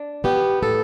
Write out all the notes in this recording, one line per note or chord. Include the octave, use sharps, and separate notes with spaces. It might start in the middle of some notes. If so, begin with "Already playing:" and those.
Already playing: D4
B3 G4
A2 A4